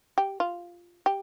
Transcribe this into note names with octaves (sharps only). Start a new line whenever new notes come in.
G4
F4
G4